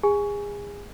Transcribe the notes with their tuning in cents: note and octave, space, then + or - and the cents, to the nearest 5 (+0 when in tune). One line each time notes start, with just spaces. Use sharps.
G#4 -30 G#5 +0